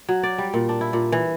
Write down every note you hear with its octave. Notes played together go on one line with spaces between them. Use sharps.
F#3
D5
G3
A#2
D4
E4
A#2
E3